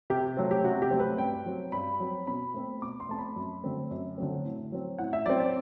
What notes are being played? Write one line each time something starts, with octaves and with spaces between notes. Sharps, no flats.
C3 G4
F#3 A3 C4
G4
C3 F#4
G4
F#3 A3 C4
B4
G2 G5
F#3 C4
G2 B5
F#3 C4
B2 B5
A3 C4
B2 D6
C6
A3 C4 A5
B5
F#2
D3 F#3 A3 C4
F#2
D3 F#3 A3 C4
A2
F#3 C4
A2 F#5
E5
F#3 C4 D5
D5